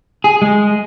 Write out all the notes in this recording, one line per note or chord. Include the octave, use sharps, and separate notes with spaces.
G#4
G#3